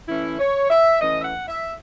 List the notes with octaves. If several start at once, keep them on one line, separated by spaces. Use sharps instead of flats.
E3 A3 C#4 E4
C#5
E5
E3 A3 C#4 D#5
E5
F#5
E5